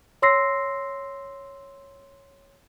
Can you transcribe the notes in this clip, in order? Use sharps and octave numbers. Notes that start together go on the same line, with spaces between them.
C#5 C6 E6 A#6 C7